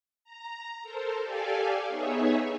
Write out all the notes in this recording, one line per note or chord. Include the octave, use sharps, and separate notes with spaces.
A#5
A4 A#4 C5
G4 A4 D5 F5 G#5
B3 D#4 G#4 C#5 E5